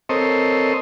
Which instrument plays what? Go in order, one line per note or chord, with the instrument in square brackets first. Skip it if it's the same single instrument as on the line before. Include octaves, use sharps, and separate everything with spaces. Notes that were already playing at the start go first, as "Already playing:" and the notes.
[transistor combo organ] C4 A4 A#4 C5 C#5 D#5